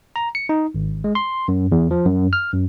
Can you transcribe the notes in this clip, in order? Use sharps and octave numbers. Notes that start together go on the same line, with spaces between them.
A#5
C#7
D#4
G#1
G#3
C6
F#2
E2
F3
F#2
F6
F#2